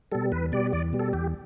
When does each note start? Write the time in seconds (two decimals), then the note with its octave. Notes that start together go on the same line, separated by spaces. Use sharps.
0.12 B2 G3 A4
0.32 E2 B4
0.52 B2 G3 D5
0.73 E2 D5
0.93 B2 G3
0.99 A4
1.13 E2 G4